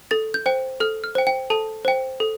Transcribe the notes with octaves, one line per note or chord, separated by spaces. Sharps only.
A4 A6
G6
C5 G5
A4 F6
F6
C5 G5
G5
A4 A5
C5 G5
A4